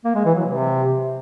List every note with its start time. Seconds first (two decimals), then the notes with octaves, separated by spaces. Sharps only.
0.05 A#3
0.15 G#3
0.25 E3
0.35 F#3
0.46 C3